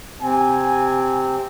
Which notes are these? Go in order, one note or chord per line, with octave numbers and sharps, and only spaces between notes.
C3 C4 G#5